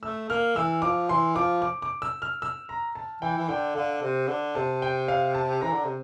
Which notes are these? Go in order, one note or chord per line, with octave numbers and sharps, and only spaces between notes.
A3 E6
A#3 F6
E3 E6
F3 D6
E3 C6
F3 D6
D6
D6
E6
F6
E6
A#5
A5
E3 G5
E3
D3 G5
D3 F5
C3
D3
C3 A5
G5
F5
A5
E3 A#5
D3
C3